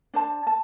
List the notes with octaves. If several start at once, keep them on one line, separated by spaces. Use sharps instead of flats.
D4 C5 A5
A5